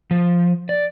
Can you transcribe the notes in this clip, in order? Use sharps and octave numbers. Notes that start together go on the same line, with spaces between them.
F3
D5